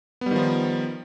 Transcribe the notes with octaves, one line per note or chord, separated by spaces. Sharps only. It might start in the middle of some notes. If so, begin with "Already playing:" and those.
D#3 F3 G3 B3